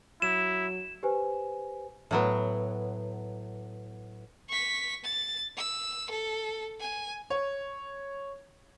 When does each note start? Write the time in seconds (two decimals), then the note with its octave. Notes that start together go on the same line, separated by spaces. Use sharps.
0.22 F#3 E4 E7
1.03 G4 B4 C5 G#5
2.11 A2 F#3 B3
4.49 C#6 B6
5.04 A6
5.57 E6
6.10 A4
6.80 G#5
7.30 C#5